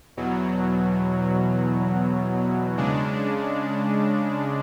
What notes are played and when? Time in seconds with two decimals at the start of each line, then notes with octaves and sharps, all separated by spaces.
0.17 E2 B2 F#3
2.77 C#3 G#3 D4